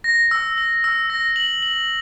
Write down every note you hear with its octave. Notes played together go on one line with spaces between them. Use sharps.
A#6
E6
E6
E6
A#6
F#7
F#7